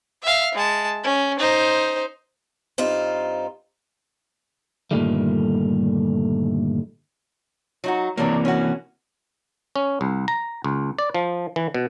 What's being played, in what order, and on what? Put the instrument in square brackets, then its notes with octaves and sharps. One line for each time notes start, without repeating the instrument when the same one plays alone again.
[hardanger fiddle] E5 F5
G#3 A5
C#4
D#4 C5
[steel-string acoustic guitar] G2 C4 D#4 F4
[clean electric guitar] G2 A#2 D3 D#3 G3 A3
[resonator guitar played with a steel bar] F#3 D#4 F#4
[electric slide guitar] C3 E3 A#3 [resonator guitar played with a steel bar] F#3 G3 D4
[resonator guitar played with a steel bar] C#4 F#4
[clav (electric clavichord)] C#4
C2
A#5
C#2
D5
F3
E3
B2